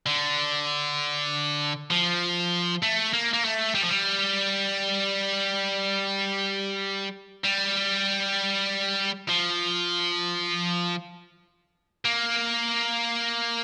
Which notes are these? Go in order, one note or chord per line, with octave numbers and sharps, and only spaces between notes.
D3
F3
A3
A#3
A#3
A3
G3
F3
G3
G3
F3
A#3